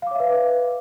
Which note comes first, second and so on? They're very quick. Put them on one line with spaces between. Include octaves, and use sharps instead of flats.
F5 D6 C#5 E5 B4